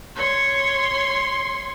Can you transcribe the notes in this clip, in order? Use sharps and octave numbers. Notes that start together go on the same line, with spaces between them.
C#5 C6